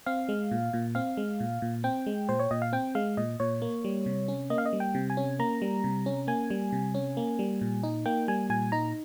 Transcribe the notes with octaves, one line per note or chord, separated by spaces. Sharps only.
C4 F5
G#3
A#2
A#2
C4 F5
G#3
A#2
A#2
C4 G5
G#3
A#2 C5
C#5
A#2 D#5
F5
C4 G5
G#3 F5
A#2 D#5
A#2 C#5
A#3
G3
C3
C#4
A#3 D#5
F5
D#5
G3
G5
C3
G#5
C#4
A#3 A#5
G3
C3
C#4
A#3 G#5
G3
C3
C#4
A#3
G3
A#2
D#4
A#3 G5
G3 G#5
A#2 G#5
D#4 A#5